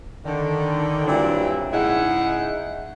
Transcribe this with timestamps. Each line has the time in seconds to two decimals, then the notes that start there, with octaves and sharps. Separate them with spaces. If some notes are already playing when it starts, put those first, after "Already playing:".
0.25 D3 D#3
1.06 G2 A#2 F#3 C4 D4 E4
1.72 G#2 C#3 D#4 E4 G#4 F#5